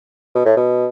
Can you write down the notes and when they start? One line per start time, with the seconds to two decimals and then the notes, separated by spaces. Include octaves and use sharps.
0.35 B2
0.45 A2
0.57 B2